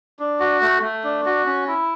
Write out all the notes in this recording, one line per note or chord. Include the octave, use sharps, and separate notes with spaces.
D4
F#4
A3
A3
D4
F#4
C#4
E4